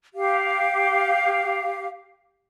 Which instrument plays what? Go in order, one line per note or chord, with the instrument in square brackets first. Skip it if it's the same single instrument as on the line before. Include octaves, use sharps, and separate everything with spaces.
[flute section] G4 F5